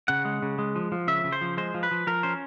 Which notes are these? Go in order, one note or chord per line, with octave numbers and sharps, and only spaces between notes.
C#3 F#5
G#3
C#3
G#3
F3
F3
C#3 E5
C#3
C5
F3
G#3 C5
F3
B4
F3
F3 A#4
C#4 C5